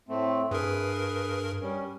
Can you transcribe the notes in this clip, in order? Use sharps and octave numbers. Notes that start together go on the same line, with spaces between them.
A2 A3 C4
G2 G#4 A#4 B4
G3 C#4